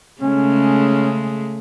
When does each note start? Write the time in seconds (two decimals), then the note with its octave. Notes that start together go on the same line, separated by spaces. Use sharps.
0.22 C#3 G#3 A3 C#4